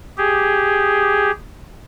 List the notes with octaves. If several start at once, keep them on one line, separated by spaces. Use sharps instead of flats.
G4 G#4